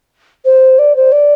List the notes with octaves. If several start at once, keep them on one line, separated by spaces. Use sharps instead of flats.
C5
D5
C5
D5